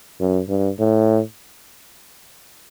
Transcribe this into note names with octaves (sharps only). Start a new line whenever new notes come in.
F#2
G2
A2